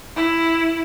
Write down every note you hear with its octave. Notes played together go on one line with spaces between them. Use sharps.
E4